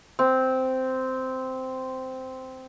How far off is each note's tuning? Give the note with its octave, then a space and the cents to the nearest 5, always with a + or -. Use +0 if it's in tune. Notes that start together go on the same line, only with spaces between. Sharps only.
C4 -10